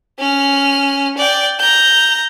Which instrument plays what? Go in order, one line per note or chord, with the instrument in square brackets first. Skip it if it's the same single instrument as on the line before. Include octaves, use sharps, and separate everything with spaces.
[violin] C#4 F6
D5 G5
A#5 G6